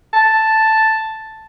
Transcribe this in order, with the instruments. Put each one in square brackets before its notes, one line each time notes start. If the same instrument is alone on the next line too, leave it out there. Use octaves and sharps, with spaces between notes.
[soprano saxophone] A5